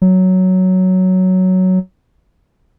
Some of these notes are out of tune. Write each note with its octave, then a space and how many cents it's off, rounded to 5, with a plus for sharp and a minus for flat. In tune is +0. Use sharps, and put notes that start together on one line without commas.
F#3 +5